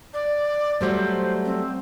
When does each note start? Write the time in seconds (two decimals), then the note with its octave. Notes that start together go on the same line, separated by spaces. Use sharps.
0.14 D5
0.81 F#3 G3 A3 C5
1.45 C4